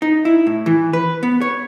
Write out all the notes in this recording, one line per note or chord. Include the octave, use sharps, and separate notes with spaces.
D#4
E4
A2
E3
B4
B3
C#5